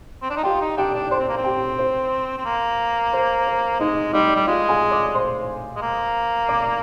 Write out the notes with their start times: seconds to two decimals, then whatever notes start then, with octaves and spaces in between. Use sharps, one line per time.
0.22 C4
0.30 D4
0.37 D#4
0.43 F4 G4 G5
0.61 D#4
0.77 D4 G4 G5
0.94 D4
1.10 D4 C5 C6
1.19 C4
1.28 A#3
1.37 C4
1.44 G4 G5
1.78 C5
2.38 C4
2.45 A#3
3.13 C5
3.47 C5
3.80 G#3 D#4 D#5
4.13 G3 D#4 D#5
4.36 G3
4.47 G#3 F4 F5
4.69 G#4 G#5
4.91 D5 D6
5.15 C5 C6
5.76 G#3
5.82 A#3
6.49 D5 D6